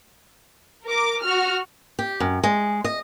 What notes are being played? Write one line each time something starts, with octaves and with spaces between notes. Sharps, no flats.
A#4 D6
F#4 F6
G4
F#2
G#3
D#5